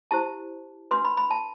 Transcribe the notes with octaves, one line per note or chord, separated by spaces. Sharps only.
E4 G4 C5 A5
D4 F#4 B4 C6
B5
B5
A5